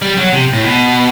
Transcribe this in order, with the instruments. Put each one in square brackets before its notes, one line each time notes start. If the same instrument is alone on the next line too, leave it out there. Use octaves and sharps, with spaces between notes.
[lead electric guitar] G3
F#3
C3
A2
B2